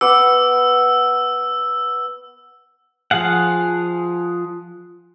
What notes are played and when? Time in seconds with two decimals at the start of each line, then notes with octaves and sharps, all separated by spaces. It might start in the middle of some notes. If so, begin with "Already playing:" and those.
0.01 B3 D6 E6
3.11 F3 G#4 F5 F#5